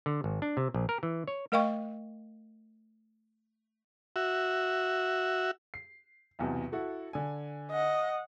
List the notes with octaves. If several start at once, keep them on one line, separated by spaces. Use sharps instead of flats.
D3
G#1
D4
C3
A#1
A#4
E3
C#5
A3 A#4 D#5 F5 G5 C#6
F#4 E5
C7
B1 E2 C3
E4 F#4 A4
D3 G#5
D#5 F#5